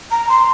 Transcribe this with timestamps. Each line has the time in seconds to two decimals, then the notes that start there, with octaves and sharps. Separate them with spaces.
0.11 A#5
0.29 C6